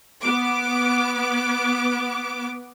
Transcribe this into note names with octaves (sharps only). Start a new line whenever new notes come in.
B3 D6